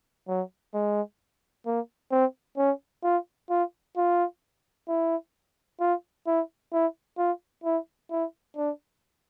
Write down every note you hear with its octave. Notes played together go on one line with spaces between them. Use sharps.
F#3
G#3
A#3
C4
C#4
F4
F4
F4
E4
F4
E4
E4
F4
E4
E4
D4